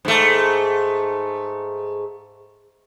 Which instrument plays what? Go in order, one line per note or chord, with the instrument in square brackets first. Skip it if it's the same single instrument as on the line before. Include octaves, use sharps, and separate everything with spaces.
[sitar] G#2 A3